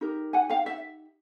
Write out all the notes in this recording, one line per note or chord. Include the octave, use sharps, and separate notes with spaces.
D#4 G4 A#4
F#5 G#5
F5 G5
E5 F#5